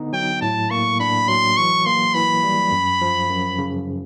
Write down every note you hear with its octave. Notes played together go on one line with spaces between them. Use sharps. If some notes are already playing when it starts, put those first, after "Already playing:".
Already playing: D3 B3 D#4
F#3 G5
A2 A5
A#3 C#6
D4 B5
F#3 C6
E3 C#6
A#3 C6
E3 B5
G3
F#2
F3
F#2
C#3